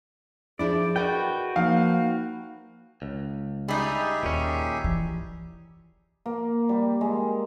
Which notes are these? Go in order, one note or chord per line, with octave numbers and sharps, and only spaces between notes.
F3 D4 E4 G#4 D5
F#4 A#4 B4 D5 D#5 G5
F3 A#3 D#4 F5
C#2
G3 D#4 G4 G#4 E5
D#2 A#2 C#4
E3
A#3
G3
G#3